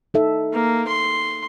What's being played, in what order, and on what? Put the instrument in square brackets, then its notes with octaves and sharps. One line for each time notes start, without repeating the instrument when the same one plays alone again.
[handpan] D#4 A4 E5
[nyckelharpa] A#3
C6